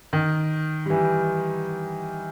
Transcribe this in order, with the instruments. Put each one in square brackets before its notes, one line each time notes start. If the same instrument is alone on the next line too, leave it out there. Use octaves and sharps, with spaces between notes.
[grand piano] D#3
G3
E3